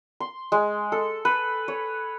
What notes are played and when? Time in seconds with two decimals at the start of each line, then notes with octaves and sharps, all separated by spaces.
0.20 C6
0.52 G#3
0.92 A4
1.25 B4
1.68 C#5